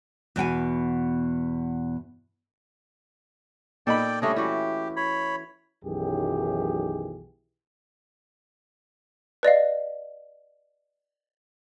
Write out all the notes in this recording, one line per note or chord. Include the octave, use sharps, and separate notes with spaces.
E2 B2 G5 G#5
A#2 D#4 A4 D5 G5 B5
G3 A3 C#4 D4 D#5
E3 F#4 G4
C#5 B5
B1 F#2 D#3 E3 G4 G#4
B4 D5 D#5 F5